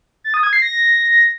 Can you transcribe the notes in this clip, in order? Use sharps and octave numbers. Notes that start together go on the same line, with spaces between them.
A6
D#6
G#6
C7
A#6